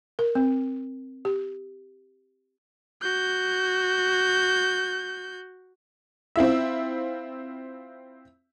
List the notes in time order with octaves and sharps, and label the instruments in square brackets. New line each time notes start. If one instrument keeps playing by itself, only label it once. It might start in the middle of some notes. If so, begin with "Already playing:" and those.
[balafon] A#4
C4
G4
[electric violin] F#4 G6
[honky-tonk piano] C4 E4 F4 E5